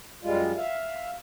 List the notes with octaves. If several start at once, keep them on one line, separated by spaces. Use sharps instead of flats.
F#2 G3 G#3 F4
E5 F5